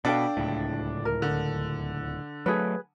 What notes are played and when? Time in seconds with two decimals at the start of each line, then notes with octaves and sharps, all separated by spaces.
0.05 B2 D4 A4 F5 G5
0.37 D1 C#2 A2
1.05 A#4
1.22 D3
2.46 F#3 A3 G#4 B4